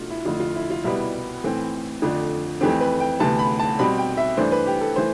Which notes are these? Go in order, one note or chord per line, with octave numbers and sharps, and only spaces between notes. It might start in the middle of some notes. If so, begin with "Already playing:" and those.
Already playing: B2 A3 D4 F4
E4
F2 D3 A3 E4 F4
F4
E4
F4
C2 B2 G3 B3 E4
A2 E3 A3 C4
F2 D3 F3 A3 D4
F2 E3 A3 C4 G4
B4
G5
D2 C3 E3 B3 A5
B5
A5
B2 G3 C4 B5
G5
E5
G2 E3 A3 D4 C5
B4
G4
A4
E3 A3 C5